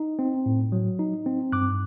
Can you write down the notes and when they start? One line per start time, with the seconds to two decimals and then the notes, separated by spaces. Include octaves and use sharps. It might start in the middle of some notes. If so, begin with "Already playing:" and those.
Already playing: D#4
0.19 C4
0.46 A2
0.72 F#3
0.99 D#4
1.26 C4
1.52 G2 D6 F#6